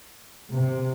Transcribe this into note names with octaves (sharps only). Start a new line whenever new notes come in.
C3